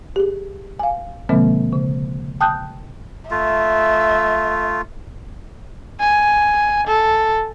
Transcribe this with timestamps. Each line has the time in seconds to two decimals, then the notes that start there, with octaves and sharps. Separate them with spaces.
0.16 G4 G#4
0.79 F5 G#5
1.29 B2 D3 F3 G#3 A#3 C4
1.73 C#3
2.41 G5 A5 D#6 F#6 G6
3.31 A3 F4 E5
6.00 G#5
6.87 A4